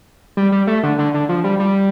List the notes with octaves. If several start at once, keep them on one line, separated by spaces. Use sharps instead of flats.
G3
G3
A3
D3
D3
D3
F3
G3
G3